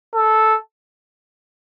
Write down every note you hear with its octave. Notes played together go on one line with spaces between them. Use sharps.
A4